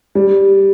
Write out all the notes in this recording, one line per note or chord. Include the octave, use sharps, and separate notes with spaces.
G3